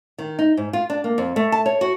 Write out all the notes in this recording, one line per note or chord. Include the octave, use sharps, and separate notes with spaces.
D#3
D#4
G#2
F4
D4
A#3
F2
A3
A5
C#5
F#4